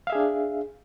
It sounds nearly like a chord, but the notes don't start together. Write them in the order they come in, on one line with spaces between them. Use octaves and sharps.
F5 E5 G#4 D4